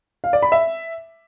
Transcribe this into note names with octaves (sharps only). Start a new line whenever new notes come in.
F5
D5
B5
E5